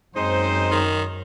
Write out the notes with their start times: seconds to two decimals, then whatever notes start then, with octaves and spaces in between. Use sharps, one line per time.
0.16 F#2 G#3 C4 D#4 C5
0.71 D#3